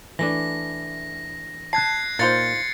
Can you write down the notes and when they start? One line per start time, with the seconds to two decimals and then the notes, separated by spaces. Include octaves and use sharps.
0.19 E3 A3 D4 A#6
1.73 A5 F#6 G#6 C7
2.19 A#2 D#4 F4 C5 G#6 A6 C#7